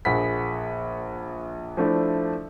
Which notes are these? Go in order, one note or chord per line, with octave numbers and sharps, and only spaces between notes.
A#1 G#4 A#4 F#5 B5 B6
F3 A3 D4 E4